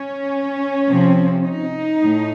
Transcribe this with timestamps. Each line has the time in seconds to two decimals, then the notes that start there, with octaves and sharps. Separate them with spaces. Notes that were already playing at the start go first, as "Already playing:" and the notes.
Already playing: C#4
0.88 C3 F3 C4
1.46 D#4
2.03 A2